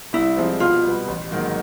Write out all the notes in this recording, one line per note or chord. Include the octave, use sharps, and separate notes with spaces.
C2 E4
C3 F3 G#3 C4
B2 F4
G3 B3
A1
G#2 D#3 F#3 A#3